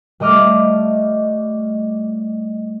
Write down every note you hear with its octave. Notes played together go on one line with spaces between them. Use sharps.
G3 A3 D#5 D6 F6